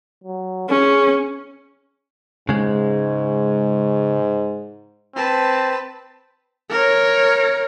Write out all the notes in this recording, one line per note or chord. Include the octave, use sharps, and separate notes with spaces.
F#3
C#4 G#4
G#2 C#3 G#3
C4 B4 A5
A#4 C#5